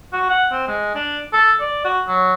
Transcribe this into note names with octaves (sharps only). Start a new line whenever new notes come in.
F#4
F#5
C4
G#3
D4
A4
D5
F#4
F#3